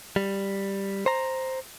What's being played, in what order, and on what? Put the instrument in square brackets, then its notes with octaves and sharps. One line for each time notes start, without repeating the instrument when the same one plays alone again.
[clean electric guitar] G3
C5 A#5